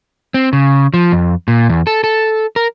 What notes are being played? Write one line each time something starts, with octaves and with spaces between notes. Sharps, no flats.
C4
C#3
F3
F2
A#2
E2
A4
A4
A#4